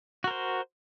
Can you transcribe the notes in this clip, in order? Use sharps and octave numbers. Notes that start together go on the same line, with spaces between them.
F#4 A#4 C5